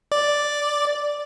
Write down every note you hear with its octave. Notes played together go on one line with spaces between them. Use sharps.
D5